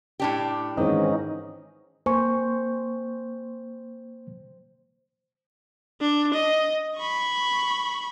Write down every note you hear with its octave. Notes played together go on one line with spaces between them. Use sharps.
A2 D4 G4
G#2 D#3 E3 C4 C#4 D#4
A#3 C5 G#5 C#6
D4
D#5
B5 C#6